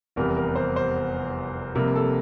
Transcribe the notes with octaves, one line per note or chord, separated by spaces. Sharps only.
F1 E2 C3 G3 A#4
A#4
C5
C5
F1 F2 C3 G3 A#3 A#4
A4